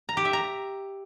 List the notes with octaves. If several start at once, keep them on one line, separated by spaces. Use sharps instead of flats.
A#5
G4
E5
A#5